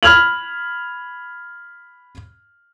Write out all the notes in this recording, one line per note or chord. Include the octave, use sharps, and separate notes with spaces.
B5 F6 G#6 F7 F#7